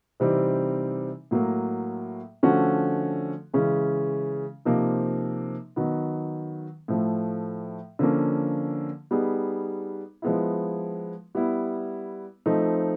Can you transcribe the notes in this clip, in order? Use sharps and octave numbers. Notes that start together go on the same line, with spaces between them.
C3 E3 G3 C4 D#4
A2 F#3 A#3
D3 F3 A3 C#4 F#4
C#3 E3 G#3 C#4
C3 F3 A#3 D#4
D#3 F#3 B3
A2 F3 A3
D3 F3 A#3 C#4
G3 B3 D#4 G#4
F3 G#3 B3 E4
G3 B3 E4
F3 A3 C4 D#4